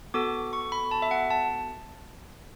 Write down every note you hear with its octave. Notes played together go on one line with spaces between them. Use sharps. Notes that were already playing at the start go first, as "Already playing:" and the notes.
B3 F#4 A4 D6
C#6
B5
A5
E5
F#5
A5